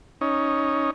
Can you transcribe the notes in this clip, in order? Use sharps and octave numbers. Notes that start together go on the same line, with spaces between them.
C#4 D#4